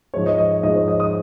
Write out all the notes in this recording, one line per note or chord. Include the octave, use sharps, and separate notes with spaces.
G#2 F3 G#3 C#5
D#5
D#5
D#5
G#2 F3 G#3 D#5
C#5
D#5
D#6